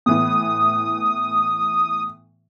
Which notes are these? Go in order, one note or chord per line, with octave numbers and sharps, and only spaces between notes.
A2 E3 B3 D#6